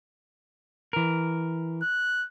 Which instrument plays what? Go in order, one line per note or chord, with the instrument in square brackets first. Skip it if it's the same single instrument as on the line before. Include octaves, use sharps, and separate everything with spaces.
[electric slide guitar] E3 A#4
[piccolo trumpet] F#6